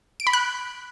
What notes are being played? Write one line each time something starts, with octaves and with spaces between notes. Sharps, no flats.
D7
B5
F#6